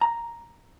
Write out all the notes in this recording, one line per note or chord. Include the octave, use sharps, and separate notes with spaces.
A#5